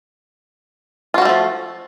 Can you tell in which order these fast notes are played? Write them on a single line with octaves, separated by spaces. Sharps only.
F4 F#4 G3 A3 F3